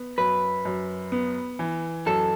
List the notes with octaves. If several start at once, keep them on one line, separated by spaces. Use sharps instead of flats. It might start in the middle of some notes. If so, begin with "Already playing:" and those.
Already playing: B3
F#2 B4
F#2
B3
E3
F#2 A4